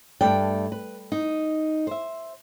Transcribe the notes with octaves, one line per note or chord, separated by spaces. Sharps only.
G2 A3 D5 G5
B4
D#4
C5 E5